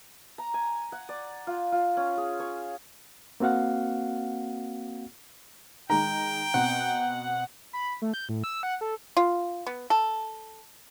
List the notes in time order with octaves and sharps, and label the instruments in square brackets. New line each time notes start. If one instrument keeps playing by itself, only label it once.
[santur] A#5
G#5
F#5
D5
F4
F4
C#4
G#4
C#5
[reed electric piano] A#3 C4 F#4 F5 F#5
[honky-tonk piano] D#3 G#3 [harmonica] G5 [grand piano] A#5
[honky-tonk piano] B2 C4 [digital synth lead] F#5
[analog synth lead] B5
A3
G6
A2
E6
F#5
A4
[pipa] F4
B3
A4